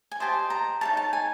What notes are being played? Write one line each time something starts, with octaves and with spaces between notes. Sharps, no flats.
G#5
G4 C5 D#5 A5
A#5
D#4 G#4 C#5 A5
A5
G#5